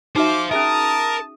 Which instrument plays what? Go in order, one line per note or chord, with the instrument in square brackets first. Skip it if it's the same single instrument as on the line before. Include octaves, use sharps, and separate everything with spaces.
[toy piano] D#4 F#4 E5 [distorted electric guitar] C5 F5 [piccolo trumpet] D6
[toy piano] C#4 G#4 E5 [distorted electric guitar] A#4 [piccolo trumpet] A5 [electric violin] D#6